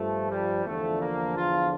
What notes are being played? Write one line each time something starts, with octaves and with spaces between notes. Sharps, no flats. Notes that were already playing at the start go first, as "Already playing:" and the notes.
Already playing: G2 F3 A3
G3
E2 D3 F3 A3
A#3
F4